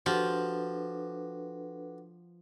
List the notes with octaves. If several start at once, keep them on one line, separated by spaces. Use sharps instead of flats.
F3 D4 F#4 G4 A4 B4